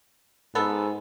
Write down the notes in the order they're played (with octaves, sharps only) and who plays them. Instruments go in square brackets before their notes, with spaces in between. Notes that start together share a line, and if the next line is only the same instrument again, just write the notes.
[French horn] G#2 [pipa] B3 A4